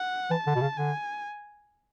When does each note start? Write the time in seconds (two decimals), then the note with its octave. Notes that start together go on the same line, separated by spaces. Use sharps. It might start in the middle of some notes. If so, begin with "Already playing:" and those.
Already playing: F#5
0.30 E3 A5
0.47 D3
0.55 B2
0.61 C#3
0.77 D3 G#5